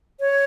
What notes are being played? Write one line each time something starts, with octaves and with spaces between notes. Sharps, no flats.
C#5